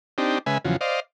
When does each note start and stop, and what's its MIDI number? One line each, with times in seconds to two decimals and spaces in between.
0.18 0.38 60
0.18 0.38 62
0.18 0.38 63
0.18 0.38 67
0.46 0.58 49
0.46 0.58 56
0.46 0.58 71
0.46 0.58 76
0.46 0.58 80
0.65 0.76 40
0.65 0.76 49
0.65 0.76 53
0.65 0.76 54
0.81 1.00 72
0.81 1.00 74
0.81 1.00 75
0.81 1.00 77